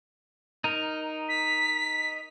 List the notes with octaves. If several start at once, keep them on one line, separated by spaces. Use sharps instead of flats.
D#4 A#4
B6